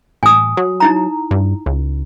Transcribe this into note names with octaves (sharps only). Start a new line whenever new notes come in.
A1 G#5 D#6
F#3
D#4 E4 A#5
G2
C#2